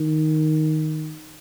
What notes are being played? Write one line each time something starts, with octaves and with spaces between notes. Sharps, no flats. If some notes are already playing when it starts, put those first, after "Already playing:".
Already playing: D#3